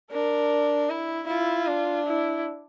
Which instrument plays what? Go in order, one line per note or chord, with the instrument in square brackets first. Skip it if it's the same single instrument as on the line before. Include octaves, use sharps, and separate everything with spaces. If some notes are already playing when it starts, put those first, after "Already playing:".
[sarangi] D4 [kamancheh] A#4
[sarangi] E4
[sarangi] E4 [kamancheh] F4
[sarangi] D4
[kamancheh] E4